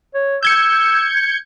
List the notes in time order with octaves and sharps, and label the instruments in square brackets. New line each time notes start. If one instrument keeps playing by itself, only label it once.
[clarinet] C#5
[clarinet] E6 [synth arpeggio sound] G6 G#6 C#7